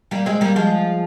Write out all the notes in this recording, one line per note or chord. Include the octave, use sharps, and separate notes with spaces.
G3 A#3
G#3 C4
G3 A#3
F3 G#3